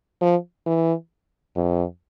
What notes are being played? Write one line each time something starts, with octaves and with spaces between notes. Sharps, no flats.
F3
E3
F2